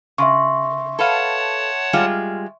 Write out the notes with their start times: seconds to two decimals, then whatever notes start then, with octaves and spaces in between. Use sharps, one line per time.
0.18 C#3 E5 C6 C#6
0.99 A4 B4 C#5 F5 F#5 A5
1.93 G3 G#3 F4